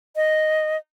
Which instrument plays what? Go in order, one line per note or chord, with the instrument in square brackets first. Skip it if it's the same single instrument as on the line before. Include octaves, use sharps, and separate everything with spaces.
[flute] D#5